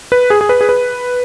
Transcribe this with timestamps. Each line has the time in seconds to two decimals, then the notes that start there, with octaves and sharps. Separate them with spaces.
0.12 B4
0.30 G#4
0.41 G#4
0.49 B4
0.61 G#4
0.69 B4